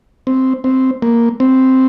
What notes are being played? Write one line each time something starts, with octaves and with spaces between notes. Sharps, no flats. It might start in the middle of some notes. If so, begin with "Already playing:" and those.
C4
C4
A#3
C4